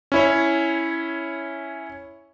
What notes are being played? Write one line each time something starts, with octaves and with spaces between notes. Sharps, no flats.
C#4 E4 C#5